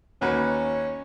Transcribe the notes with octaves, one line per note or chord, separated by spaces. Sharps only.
D#2 C#4 F#4 B4